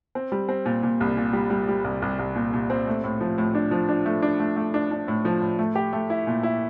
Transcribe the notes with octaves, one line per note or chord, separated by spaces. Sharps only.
C4
G3
C4
A#2
A#2
C2
A#2
G3
G3
G3
C2
C2
C2
A#2
A#2
C4
A3
A2
F3
A2
D4
F3
D4
A3
D4
A3
A3
D4
D4
A2
F3
A2
A3
G4
A3
E4
A#2
E4